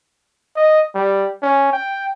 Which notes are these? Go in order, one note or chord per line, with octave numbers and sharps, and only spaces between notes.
D#5
G3
C#4
G5